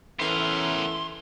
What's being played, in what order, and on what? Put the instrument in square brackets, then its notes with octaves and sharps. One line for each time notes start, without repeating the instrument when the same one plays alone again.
[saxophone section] E3 C#4 [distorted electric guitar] B3 A#4 [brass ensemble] A4 E5 [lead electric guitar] C6